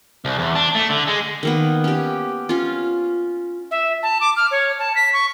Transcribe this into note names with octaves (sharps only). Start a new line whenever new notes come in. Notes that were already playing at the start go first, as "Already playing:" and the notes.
C2
E2
D4
A3
D3
G#3
D#3 A#3 B3
C#4 G4
C#4 F4
E5
A5
D6
F6
C#5
A5
B6
C#6